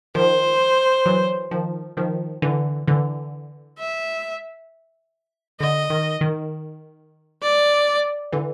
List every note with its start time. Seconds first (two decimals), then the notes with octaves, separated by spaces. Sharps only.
0.15 D#3 F3 C5
1.06 E3 F#3
1.51 D#3 F3
1.97 D#3 F3
2.42 D3 E3
2.88 D3 E3
3.79 E5
5.60 D3 D#5
5.90 D#3
6.21 D#3
7.42 D5
8.32 D3 E3